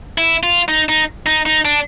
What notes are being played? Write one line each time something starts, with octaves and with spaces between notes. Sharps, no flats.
E4
F4
D#4
D#4
D#4
D#4
D4